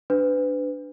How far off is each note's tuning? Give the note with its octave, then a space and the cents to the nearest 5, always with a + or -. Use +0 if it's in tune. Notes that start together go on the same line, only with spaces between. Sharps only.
D4 +0 B4 +30